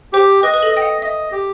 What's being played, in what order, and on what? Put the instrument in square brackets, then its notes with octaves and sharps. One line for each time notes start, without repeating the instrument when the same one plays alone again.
[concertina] G4 [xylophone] C5
[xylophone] B4 [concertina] D#5
[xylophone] B4
A4
[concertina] D#5 [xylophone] G5
[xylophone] F#5
[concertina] D#5 [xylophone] E5
[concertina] G4